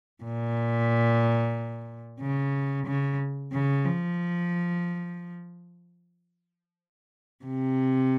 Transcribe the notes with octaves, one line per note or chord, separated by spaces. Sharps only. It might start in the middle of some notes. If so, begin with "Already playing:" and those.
A#2
C#3
C#3
C#3
F3
C3